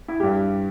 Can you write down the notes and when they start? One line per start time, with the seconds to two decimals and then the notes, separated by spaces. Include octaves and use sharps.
0.08 E4
0.20 G2 G3 G4